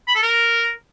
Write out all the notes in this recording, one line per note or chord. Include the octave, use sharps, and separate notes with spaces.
B5
A4
A#4